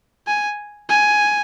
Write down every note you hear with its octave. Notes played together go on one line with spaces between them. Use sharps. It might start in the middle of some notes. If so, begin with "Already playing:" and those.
G#5
G#5